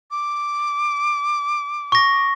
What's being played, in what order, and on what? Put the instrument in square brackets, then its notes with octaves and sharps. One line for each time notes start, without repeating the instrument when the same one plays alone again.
[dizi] D6
[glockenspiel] C#6 A#6